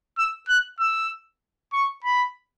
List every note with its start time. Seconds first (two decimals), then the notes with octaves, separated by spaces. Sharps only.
0.18 E6
0.48 F#6
0.79 E6
1.73 C#6
2.04 B5